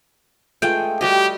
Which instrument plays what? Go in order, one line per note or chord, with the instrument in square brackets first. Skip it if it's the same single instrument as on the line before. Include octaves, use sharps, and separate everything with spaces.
[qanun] G#3 A3 F4 [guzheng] G5
[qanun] G3 F#4 D#5 [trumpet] G4